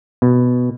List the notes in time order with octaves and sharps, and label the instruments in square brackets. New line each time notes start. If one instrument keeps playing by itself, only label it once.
[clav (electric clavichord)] B2